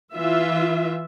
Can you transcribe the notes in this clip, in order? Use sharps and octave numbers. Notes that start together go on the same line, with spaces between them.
E3 F4 E5